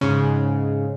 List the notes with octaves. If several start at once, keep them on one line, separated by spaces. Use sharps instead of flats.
G#2 C#3